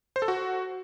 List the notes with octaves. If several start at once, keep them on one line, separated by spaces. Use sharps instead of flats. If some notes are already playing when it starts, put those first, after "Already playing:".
C5
A4
F#4